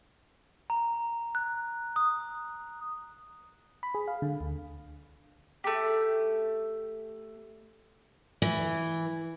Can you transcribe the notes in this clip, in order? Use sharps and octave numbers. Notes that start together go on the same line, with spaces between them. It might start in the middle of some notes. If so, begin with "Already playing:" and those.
A#5
F#6
D#6
B5
G#4
F5
D3
D2
A3 G4
E3